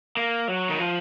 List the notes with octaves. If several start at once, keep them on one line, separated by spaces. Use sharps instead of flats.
A#3
F#3
D#3
F3